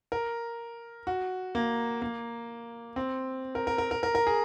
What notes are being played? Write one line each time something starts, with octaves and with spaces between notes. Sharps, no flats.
A#4
F#4
A#3
A#3
C4
A#4
A#4
A#4
A#4
A#4
A#4
G#4